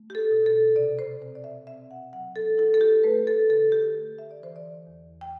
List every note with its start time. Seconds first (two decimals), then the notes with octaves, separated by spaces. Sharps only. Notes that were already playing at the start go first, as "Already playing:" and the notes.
Already playing: A3
0.10 G4
0.15 A4
0.31 B2
0.46 A4
0.76 C3 D5
0.99 C5
1.21 C4 C5
1.35 D5
1.44 E5
1.67 C4 E5
1.91 F#5
2.13 F#3 F#5
2.36 A4
2.58 E4 A4
2.74 A4
2.81 G4
3.03 A3 B4
3.27 A4
3.50 D3 A4
3.72 G4
3.95 A3
4.18 E5
4.31 D5
4.40 E3 C5
4.56 D5
4.87 E2
5.21 G5